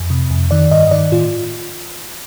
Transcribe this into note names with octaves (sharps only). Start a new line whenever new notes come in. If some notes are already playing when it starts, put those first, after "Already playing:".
Already playing: F2
C3
F2
D#3 D5
G2 D#5
D#5
D#3 D5
A2 F4